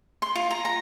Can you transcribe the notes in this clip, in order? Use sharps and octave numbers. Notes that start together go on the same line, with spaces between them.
C6
F4
A#5
A#5